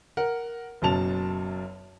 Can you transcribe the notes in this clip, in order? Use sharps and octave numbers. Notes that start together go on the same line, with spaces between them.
A#4 F#5
F#1 F#2 B2 A5 F7